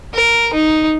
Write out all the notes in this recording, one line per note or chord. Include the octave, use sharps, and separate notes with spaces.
A#4
D#4